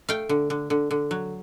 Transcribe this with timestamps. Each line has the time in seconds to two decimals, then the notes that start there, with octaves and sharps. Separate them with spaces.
0.09 A3 F5 G5
0.29 D3
0.50 D3
0.70 D3
0.91 D3
1.11 F#3